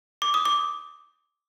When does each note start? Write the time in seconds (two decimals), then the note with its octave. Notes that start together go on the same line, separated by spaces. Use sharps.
0.22 D6
0.34 D#6
0.45 D6